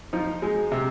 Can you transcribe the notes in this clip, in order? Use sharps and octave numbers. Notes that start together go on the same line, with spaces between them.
F3 D#4
G#3
C3